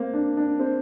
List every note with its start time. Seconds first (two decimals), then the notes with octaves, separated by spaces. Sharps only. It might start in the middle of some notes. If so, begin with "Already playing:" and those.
Already playing: A#3 C4
0.13 D4
0.37 D4
0.59 C4